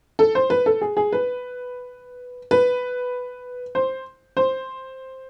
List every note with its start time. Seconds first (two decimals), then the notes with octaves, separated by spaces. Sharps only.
0.19 A4
0.35 C5
0.50 B4
0.66 A4
0.81 G#4
0.97 G#4
1.13 B4
2.51 B4
3.75 C5
4.37 C5